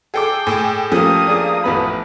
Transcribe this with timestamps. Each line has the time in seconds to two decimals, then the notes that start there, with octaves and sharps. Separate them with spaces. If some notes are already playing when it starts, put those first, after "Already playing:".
0.14 G#4 A4 G5 D6
0.47 A2 G#4 G#5
0.92 F3 A3 A#3 C#4 G4 D#6
1.27 D4 G#4
1.64 A1 B3 B5